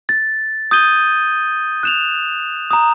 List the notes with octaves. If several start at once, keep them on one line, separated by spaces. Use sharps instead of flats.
A6
D#6 G6 G#6 D#7 G7
F#6 E7 F7
A#5 D#6